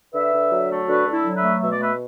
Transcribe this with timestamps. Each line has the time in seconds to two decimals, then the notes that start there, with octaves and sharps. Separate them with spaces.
0.14 D3 B4 E5
0.33 D3
0.51 F#3
0.70 A3
0.88 D3 F#4 B4
1.05 D3
1.12 E4 A4
1.24 F#3
1.36 B4 E5
1.42 A3
1.61 B2 E5
1.71 D5
1.79 A3 B4 E5